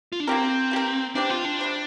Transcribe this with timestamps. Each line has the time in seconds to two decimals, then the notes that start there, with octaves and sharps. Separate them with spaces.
0.12 F4
0.20 D4
0.27 A#3 C4 G4 A#4
0.71 A#3 G4 A#4
1.15 C3 G3 C4 D4 G4
1.30 F4
1.45 D4
1.59 C3 G3 C4 G4